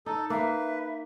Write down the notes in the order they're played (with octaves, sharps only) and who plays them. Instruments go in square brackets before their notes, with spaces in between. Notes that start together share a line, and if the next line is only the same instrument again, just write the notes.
[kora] D#4 [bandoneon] A4
[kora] A#3 [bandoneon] B4 [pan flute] E5